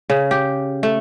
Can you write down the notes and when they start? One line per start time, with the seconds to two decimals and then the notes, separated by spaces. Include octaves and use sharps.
0.10 C#3
0.31 G4
0.83 A3